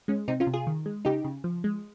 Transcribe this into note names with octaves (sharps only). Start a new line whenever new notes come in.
G#3 C#4
C3 C4 D#4
C#4 F4
C3
F4 G#4
D#3
G#3
C#3 D#4 G4
C#3
F3
G#3